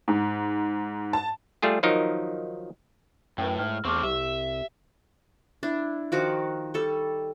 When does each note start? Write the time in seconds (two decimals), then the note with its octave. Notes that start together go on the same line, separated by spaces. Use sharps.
0.08 G#2
1.13 A5
1.62 G3 A3 F4 G#4
1.83 D#3 F3 F#3 D#4 A#4
3.38 F#2 A2 B4 G5
3.59 G#2 F6
3.85 E2 A3 C4 C#6 D6 F6
4.03 C2 G4 E5
5.63 D4 E4
6.12 D#3 F3 F#4 D6
6.74 G3 A4 C#6